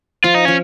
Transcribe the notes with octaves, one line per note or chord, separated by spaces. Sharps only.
F3 F4
D#4
F3 C#4